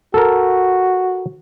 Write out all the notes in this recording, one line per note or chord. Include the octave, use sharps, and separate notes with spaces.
F#4 A4 A#4